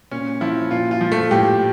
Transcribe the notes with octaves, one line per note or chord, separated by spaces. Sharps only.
A#2 C#4
F3 E4
A#2 F4
F4
F3
A3
A2 G4